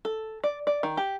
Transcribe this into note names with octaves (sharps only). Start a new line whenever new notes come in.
A4
D5
D5
D#3
G4